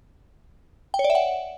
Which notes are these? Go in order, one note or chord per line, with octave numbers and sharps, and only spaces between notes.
G5
C#5
D5
E5
F#5